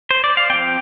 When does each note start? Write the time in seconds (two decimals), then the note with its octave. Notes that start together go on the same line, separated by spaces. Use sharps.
0.11 C5
0.24 D5
0.37 F5
0.50 F3 C4 G5